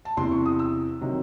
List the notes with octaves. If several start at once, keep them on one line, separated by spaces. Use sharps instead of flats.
A5
E2 C3 E3 C6
C#6
D#6
E6
C3 D#3 F#3